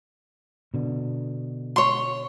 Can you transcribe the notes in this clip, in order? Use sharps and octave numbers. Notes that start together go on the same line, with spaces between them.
B2 D3
C#5 C6